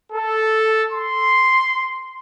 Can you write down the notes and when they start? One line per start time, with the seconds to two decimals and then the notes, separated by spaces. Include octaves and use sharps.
0.12 A4
0.92 C6